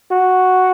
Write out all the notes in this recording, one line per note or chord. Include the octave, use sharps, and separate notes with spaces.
F#4